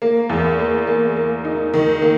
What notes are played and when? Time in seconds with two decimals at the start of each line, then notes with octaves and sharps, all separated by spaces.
0.02 A#3
0.29 E2
0.59 A#3
0.87 A#3
1.16 A#3
1.44 D#4
1.74 D#3
2.02 A#3